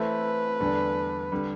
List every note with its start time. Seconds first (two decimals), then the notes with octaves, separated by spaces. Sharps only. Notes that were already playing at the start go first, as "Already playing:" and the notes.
Already playing: E3 A3 C4 E4 B4
0.60 E2 D3 G3 D4 A4
1.32 D3 G3